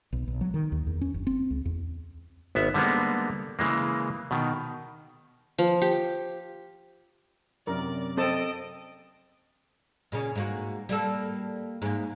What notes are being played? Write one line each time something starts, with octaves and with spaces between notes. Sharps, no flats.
B1
B1
F#3
D#3
D#2
E2
C#4
F#1
C4
C#2
E2
G#1 B3 E5
D3 G3 G#3 A#3 B3
C#3 E3 G#3 A#3
B2 D#3
F3
G4
F#2 C3 A#4 D5
C4 A4 D#5 A5 D7
A#2 C#3 C#4
G#2 A#3 F#4
G3 A#3 A4
G#2 A#3